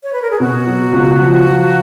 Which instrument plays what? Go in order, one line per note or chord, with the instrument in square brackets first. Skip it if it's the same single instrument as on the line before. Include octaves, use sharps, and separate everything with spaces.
[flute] C#5
B4
A#4
G#4
[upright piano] B2 [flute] F#4
[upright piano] F#3
C#2
F3
F3